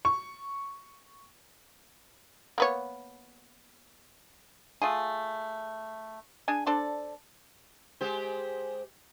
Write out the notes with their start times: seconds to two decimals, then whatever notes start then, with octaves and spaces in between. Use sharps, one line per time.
0.05 C#6
2.58 A#3 B3 C#5
4.82 A3 F4 G#4
6.48 D4 G#4 G#5
6.66 D4 A4 C5 D5
8.01 G#3 G4 C5